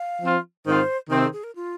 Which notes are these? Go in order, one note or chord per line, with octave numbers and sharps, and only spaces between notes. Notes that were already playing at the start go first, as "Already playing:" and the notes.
Already playing: F5
F3 C4 F4
G#2 D#3 C4 F4 C5
C3 D#3 C4 A#4
G#4
G#4
A#4
F4